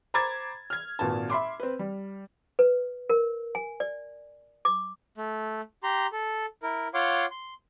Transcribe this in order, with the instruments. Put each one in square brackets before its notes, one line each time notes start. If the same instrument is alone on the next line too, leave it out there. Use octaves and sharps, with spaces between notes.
[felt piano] C5 A#5 B5 D6 G#6 A6
F6 G#6
G#1 A#2 F#4 B4 A5
E5 B5 C6 D6
C4 B4
G3
[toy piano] B4
A#4
G#5
D5
D6
[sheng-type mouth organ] A3
G4 A#5 C6
A4
E4 A#4
F4 C#5 F5 F#5 C6 D6
C6